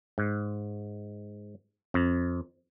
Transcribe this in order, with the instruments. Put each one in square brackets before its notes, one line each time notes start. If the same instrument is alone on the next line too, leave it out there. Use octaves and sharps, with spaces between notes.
[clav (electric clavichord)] G#2
F2